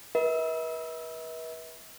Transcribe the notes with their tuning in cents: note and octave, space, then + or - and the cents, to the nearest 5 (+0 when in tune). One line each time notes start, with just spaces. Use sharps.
B4 -35 E5 -45